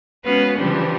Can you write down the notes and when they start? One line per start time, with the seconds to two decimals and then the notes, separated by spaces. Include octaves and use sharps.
0.25 G#3 B3 C#4 F#4 B4 F5
0.57 C#3 E3 F3 G3 D4 G4